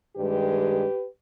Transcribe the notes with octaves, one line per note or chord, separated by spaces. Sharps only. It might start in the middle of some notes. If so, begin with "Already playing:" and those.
G2 D#3 G#3 G4 B4